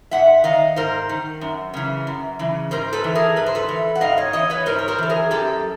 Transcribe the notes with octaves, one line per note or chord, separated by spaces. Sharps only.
G#2 E5 F#5
D#3 D#5 F5
G#2 A#4 C5
D#3
F#2
C#3 E3
F#2
C#3 E3
G#2 A#4 C5
A4 B4
E3
G#4 A#4
G#2 B4
C5
A4 B4
E3
F#5
G#2 D#5 F5
C#5 D#5
E3 C#5 D#5
B4 C#5
G#2 A#4 C5
C#5
A#4 C5
E3 A4
G#4 A#4
F#2 G4 A4